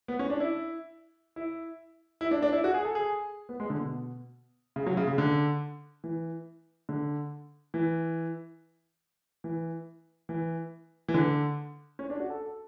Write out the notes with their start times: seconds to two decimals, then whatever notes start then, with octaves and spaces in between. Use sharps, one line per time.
0.08 B3
0.19 C#4
0.30 D4
0.40 E4
1.36 E4
2.21 E4
2.31 D4
2.42 D4
2.53 E4
2.64 F#4
2.74 G#4
2.85 A4
2.95 G#4
3.49 B3
3.60 G#3
3.70 D3
3.80 B2
4.76 C#3
4.86 F#3
4.97 C#3
5.08 C#3
5.18 D3
6.04 E3
6.89 D3
7.74 E3
9.44 E3
10.29 E3
11.08 E3
11.14 D3
11.99 C#4
12.10 D4
12.20 F#4
12.30 A4